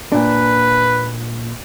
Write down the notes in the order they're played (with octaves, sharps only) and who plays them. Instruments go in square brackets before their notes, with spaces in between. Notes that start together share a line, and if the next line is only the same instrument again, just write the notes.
[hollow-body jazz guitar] A#2 D4 [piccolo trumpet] B4